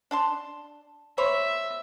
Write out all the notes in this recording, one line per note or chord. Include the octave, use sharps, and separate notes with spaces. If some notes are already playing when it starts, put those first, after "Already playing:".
D4 A5 C6
C5 C#5 E5 B5